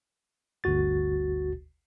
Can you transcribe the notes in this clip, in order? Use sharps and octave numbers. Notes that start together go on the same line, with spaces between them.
G1 D2 F#4 A6